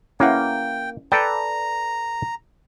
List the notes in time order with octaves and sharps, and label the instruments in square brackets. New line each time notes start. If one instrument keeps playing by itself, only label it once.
[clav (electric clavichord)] A#3 [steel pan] C#4 E4 F#5 [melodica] G5
[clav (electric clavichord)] A4 B4 D5 [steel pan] G5 [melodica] A#5